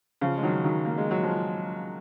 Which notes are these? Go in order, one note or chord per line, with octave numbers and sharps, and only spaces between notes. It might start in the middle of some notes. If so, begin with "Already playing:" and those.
C#3 F3
G#3
D#3 F#3
D#3 F#3
A#3
G#3
F#3
F3 G#3